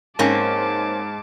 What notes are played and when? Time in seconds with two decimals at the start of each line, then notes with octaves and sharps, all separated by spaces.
0.19 G#2 A#3 C4 C#4 A5 D6